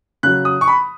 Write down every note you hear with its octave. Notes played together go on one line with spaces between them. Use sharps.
C#3 F#3 F#6
D#6
C#6
B5